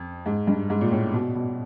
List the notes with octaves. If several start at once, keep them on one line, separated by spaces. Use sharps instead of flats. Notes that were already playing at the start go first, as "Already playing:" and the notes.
Already playing: F2
G#2
G2
G#2
A#2
A2
B2
B2